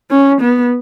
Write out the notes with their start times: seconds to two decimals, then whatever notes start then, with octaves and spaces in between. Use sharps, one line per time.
0.11 C#4
0.41 B3